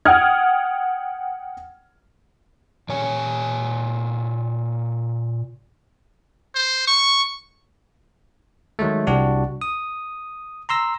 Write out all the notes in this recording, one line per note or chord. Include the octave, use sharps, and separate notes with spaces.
F#5 G5 D#6 F6 G#6
A#2 C#5 G#5
C5
C#6
D#3 F#3 G#3 A3
C2 D4 F#4 G4
D#6
A#5 C6 E6 A#6